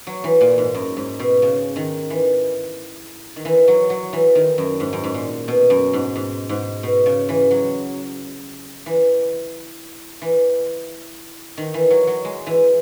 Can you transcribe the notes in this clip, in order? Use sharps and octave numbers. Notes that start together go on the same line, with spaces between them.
F#3
E3
A#2
G#2
F#2
G#2
B2
C#3
D#3
E3
D#3
E3
F#3
F#3
E3
D#3
F#2
G#2
F#2
G#2
A#2
B2
F#2
G#2
G#2
G#2
B2
C#3
E3
F#3
E3
E3
D#3
E3
F#3
F#3
G#3
E3